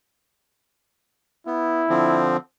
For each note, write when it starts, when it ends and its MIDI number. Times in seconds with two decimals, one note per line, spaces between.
1.47 1.86 59
1.47 2.28 64
1.89 2.37 50
1.89 2.37 53
1.89 2.37 60